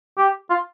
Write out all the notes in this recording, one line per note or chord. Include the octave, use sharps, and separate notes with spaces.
G4
F4